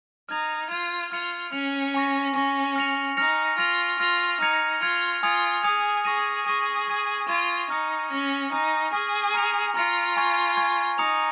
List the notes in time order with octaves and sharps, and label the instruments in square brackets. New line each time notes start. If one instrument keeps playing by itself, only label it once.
[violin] D#4 [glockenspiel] F6 G#6 F7
[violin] F4 [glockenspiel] F6 G#6 F7
[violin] F4 [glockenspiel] F6 C#7 F7
[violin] C#4 [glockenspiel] F6 C#7 F7
[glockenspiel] G#5 C#6 A#6
[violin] C#4 [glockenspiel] G#5 C#6 A#6
[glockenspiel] F6 A#6 C#7 F7
[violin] D#4 [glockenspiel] F6 A#6 C#7 F7
[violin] F4 [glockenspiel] F6 A#6 F7
[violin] F4 [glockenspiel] F6 A#6 F7
[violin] D#4 [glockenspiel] F6 G#6 C#7 F7
[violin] F4 [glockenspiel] F6 G#6 C#7 F7
[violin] F4 [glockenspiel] G#5 D#6 G#6 C#7 F7
[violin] G#4 [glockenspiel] G#5 D#6 G#6 C#7 F7
[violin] G#4 [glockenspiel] C#6 A#6 D#7
[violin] G#4 [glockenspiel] C#6 A#6 D#7
[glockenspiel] C#6 G#6 D#7
[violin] F4 [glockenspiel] C#6 G#6 D#7
[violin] D#4 [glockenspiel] C#6 F6 A#6 C#7
[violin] C#4 [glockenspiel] C#6 F6 A#6 C#7
[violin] D#4 [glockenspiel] G#5 C#6 F6 A#6
[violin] G#4 [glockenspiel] G#5 C#6 F6 A#6
[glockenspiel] A#5 F6 A#6 C#7 F7
[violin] F4 [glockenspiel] A#5 F6 A#6 C#7 F7
[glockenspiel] G#5 C#6 G#6
G#5 C#6 G#6
[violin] D#4 [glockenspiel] A#5 D#6 C#7 F7